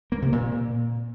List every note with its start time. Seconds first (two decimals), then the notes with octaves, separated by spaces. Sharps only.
0.12 A#3
0.22 C3
0.32 A#2